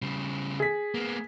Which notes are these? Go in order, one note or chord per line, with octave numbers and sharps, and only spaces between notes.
C#3 G3
G#4 B6
A#3 B3